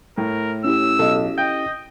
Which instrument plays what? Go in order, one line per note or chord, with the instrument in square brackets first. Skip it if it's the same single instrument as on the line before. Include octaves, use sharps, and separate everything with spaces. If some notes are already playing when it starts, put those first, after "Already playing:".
[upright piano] A2 [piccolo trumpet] A#4
[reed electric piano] C#4 E4 G4 [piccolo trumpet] E6
[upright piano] B1 [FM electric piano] A4 D#5
[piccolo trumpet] D#5 [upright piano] G5 [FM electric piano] G6